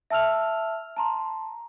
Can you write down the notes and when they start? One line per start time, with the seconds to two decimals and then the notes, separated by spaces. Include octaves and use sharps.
0.10 E5 A5 E6 F6 F7
0.97 A5 A#5 C6